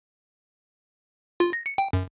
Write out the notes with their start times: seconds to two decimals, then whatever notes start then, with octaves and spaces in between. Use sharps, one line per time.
1.40 F4
1.53 A#6
1.66 C#7
1.78 G5
1.93 F#2